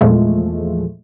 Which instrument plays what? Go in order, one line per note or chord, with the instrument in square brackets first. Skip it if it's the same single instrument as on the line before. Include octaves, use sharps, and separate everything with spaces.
[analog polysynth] E2 A#2 F3 G#3 A3